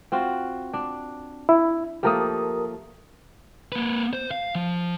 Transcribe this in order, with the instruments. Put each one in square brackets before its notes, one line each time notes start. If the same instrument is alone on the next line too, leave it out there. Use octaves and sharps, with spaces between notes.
[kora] C4 F4 F#4
D4
[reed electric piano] E4
[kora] F3 A3 A#3 [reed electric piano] G4 A#4 D#6
[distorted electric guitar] A#3 B4
C5
F5
F3